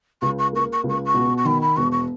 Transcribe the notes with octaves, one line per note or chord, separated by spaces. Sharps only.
C#2 C#6
C#6
A#3 C#6
C#6
C#2
C#6
C#6
B2
C#6
D#3 B5
B5
E1 C#6
C#6